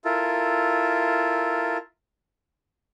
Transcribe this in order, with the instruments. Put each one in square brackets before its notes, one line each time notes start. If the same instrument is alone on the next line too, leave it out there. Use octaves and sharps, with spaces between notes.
[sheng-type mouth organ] E4 F4 A4 A#4